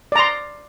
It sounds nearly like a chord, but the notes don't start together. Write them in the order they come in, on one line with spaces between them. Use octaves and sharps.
D5 A#5 C6